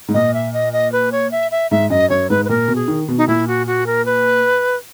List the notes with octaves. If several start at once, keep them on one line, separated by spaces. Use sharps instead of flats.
G#2
A#2 D#5
E5
D#5
D#5
B4
C#5
E5
E5
G#2 E5
F#2 D#5
F#2 C#5
G#2 B4
B4
A#2 A#4
B2
G#4
D#3
B2
D#4
A#2 E4
F#4
F#4
A#4
B4